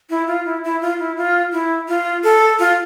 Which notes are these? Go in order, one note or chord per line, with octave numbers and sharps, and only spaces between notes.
E4
F4
E4
E4
F4
E4
F4
E4
F4
A4
F4